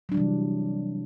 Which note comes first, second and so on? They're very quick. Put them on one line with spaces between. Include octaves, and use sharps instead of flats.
F#3 D4 G3 E3 C3